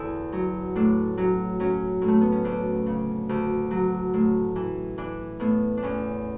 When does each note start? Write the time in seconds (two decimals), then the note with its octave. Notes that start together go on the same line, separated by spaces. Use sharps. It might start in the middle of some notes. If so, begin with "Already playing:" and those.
Already playing: E2 D3 E4 A4
0.32 F#3
0.75 A2 D4
1.18 F#3 C#4
1.60 F#3 C#4
2.02 A2
2.08 A3
2.21 B3
2.32 C#4
2.44 D2 D4
2.86 C#3
3.29 D2
3.71 F#3
4.14 A2
4.56 E3
4.98 E3 D4
5.40 A2 B3
5.77 D4
5.83 E2 C#4